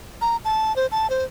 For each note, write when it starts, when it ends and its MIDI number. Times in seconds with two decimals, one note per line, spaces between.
0.21 0.36 82
0.45 0.74 81
0.76 0.86 72
0.92 1.10 81
1.10 1.24 72